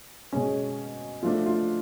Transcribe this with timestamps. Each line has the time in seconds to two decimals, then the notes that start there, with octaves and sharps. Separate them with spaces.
0.33 B2 G#3 C#4
1.23 F3 A3 D4 F4
1.46 F4